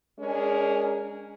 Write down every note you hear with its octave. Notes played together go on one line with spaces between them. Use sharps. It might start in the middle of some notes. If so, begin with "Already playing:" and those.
G#3 C#4 D4 G#4 A#4